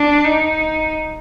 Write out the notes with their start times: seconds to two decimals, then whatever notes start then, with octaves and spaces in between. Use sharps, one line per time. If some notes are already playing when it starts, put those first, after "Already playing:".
Already playing: D4
0.24 D#4